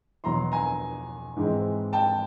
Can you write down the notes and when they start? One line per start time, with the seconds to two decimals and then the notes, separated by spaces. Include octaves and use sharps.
0.24 E2 B2 F#3 A#5 C6
0.52 G#5 A#5
1.36 G#2 E3 G#3 C4
1.93 G5 A5